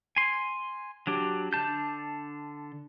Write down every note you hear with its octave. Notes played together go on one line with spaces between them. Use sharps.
G#5 C6
F#3 D4 G4
D3 D4 A5 G6